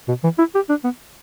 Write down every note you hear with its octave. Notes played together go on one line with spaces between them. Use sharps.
B2
E3
E4
G4
D4
B3